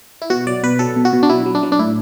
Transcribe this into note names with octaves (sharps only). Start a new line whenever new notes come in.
E4
B2 F#4
F#3 D5
B2 B4
F#3 A4
B2
F#4
B2
D4
F#3 E4
F#3
D4
F#3
D4
A2 E4